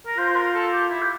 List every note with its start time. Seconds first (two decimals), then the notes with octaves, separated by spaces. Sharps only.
0.06 A#4
0.17 F4 C5
0.29 C5
0.36 A#4
0.54 A4
0.72 G4
0.90 E4
1.02 G4